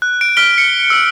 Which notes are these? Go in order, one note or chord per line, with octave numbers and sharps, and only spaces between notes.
F#6
D7
F6 B6 D7 G7
C#7
E6 C#7